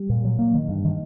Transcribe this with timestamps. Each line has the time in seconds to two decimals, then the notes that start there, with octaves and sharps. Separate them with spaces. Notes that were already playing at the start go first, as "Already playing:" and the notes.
Already playing: G3
0.09 A#2
0.25 F#3
0.39 A#3
0.55 D#3
0.68 G2
0.85 D#3